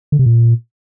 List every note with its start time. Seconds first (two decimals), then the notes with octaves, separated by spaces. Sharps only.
0.12 D3
0.19 C3
0.26 A#2